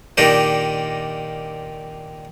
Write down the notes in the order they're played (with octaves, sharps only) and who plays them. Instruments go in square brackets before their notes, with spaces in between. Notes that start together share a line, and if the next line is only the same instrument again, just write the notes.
[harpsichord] A#2 D#3 D4 D#4 G4